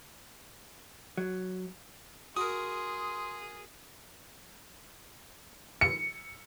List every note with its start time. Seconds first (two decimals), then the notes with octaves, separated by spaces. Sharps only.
1.17 F#3
2.36 F#4 G#4 A#4 C6 D#6
5.81 C#7